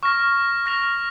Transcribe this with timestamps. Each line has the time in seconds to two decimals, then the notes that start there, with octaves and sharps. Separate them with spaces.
0.03 C#6 F6 A#6
0.66 F6 A#6 F7